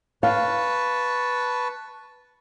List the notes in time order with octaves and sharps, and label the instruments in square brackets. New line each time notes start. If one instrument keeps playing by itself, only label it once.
[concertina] B4 A5 C#6 [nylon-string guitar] F5